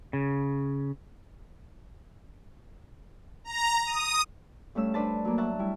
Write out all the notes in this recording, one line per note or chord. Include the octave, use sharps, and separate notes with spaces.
C#3
A#5
D#6
G2 A3 C#4 E6
D4 B4 C5 A5
F#3 A#3
E5 F#5 A5 C#6
G3 E4